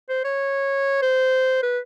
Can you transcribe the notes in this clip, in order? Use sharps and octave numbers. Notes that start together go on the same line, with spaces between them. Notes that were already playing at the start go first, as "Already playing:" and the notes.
C5
C#5
C5
B4